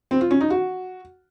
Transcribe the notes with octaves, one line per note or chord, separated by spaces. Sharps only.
C4
F4
C#4
D#4
F#4